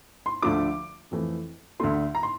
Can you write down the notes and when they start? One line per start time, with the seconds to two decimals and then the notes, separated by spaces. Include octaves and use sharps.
0.26 C6
0.42 D2 D3 F3 A3 D6
1.11 F2 E3 A3
1.80 D2 D3 A3 C6
2.15 A#5
2.23 C6